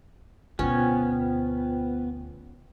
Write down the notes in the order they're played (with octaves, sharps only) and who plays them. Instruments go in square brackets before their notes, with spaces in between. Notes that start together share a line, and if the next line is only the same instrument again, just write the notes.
[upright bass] D2 B2 [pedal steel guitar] B3 [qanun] C#4 [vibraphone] F4 C5 G5